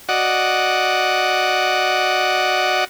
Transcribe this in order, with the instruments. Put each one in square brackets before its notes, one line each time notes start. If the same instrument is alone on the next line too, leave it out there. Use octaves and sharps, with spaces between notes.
[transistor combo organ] F#4 D5 D#5 F#5